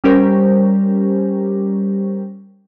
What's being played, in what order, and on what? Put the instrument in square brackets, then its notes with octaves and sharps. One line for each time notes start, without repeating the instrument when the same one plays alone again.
[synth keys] G3 C#4 G4 A#4 C5